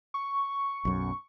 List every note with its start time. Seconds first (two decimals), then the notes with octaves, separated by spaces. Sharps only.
0.14 C#6
0.85 B1 F#2